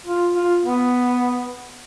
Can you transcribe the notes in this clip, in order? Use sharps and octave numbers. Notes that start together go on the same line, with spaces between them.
F4
F4
B3